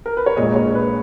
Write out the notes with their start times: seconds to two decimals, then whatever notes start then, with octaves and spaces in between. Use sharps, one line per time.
0.06 A#4
0.17 B4
0.26 C#5
0.36 A#1 A#2 G#3 D#5
0.56 C#5
0.75 B4